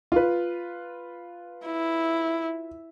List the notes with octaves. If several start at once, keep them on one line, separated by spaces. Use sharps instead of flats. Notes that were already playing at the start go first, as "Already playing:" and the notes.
F4 B4
E4